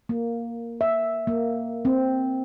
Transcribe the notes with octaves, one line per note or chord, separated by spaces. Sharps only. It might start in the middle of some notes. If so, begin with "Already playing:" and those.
A#3
E5
A#3
C4